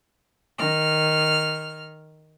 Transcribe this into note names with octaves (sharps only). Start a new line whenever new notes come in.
D#3 F6